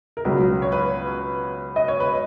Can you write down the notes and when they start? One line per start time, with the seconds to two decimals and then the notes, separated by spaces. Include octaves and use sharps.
0.17 A#4
0.25 C#2 B2 F#3 B4
0.62 C#5
0.72 B4
1.76 D#5
1.88 C#5
2.00 B4